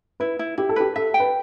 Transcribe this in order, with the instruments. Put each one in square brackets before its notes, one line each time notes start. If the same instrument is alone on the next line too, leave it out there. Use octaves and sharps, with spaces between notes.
[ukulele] E4 [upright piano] B4
[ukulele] E4
[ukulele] E4 [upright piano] G4
[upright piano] A4
[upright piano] G4 [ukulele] B4
[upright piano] A4 [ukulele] E5
[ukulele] G5
[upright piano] B4